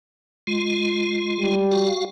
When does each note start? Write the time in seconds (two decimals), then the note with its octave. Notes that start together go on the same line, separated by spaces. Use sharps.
0.47 G#3 F4
1.39 G3
1.71 F#4 F5